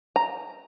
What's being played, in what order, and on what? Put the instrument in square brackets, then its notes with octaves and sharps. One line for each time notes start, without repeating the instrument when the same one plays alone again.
[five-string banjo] A#5